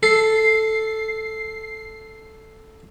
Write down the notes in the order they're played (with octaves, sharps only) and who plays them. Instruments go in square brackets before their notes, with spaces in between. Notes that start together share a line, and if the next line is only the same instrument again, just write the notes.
[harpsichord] A4 [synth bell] C7